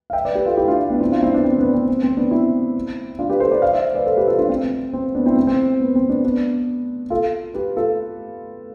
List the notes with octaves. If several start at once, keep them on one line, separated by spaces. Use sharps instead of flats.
F5
E5 G5
B4 D5
G4 B4
F4 A4
E4 G4
D4 F4
B3 D4
C4 E4
D4 F4
C4 E4
B3 D4
C4
B3 D4
C4
C4
C4
B3 D4
C4 E4
D4 F4
G4 B4
A4 C5
B4 D5
D5 F5
C5 E5
B4 D5
A4 C5
G4 B4
F4 A4
D4 F4
C4
C4
C4
B3 D4
C4 E4
C4
C4
B3
C4
B3 D4
B3 D4
F4 A4
G4 B4
F4 A4